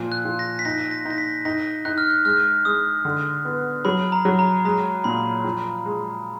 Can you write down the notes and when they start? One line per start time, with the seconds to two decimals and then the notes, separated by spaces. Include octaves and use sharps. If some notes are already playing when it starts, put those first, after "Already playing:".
Already playing: A#2 F3
0.12 F#6
0.25 F3
0.39 A#6
0.59 B6
0.65 D#4 A#6
0.91 A#6
1.05 D#4
1.10 A#6
1.18 B6
1.45 D#4 A#6
1.85 D#4 F#6
1.98 F6
2.10 F#6
2.25 G#3 F6
2.65 G#3 D#6
3.05 D3
3.45 B3
3.85 F#3 B5
4.12 A#5
4.25 F#3
4.39 A#5
4.65 G#3 A#5
5.04 A#2 B5
5.44 F3
5.85 G#3